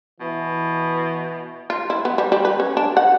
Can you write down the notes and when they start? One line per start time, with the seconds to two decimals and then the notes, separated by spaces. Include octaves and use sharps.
0.20 B2 E3
1.70 F4
1.90 E4
2.05 B3
2.18 G3
2.32 G3
2.45 B4
2.60 C#4
2.77 D4
2.97 F#5